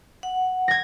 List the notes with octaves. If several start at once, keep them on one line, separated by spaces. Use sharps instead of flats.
F#5
G#6 A#6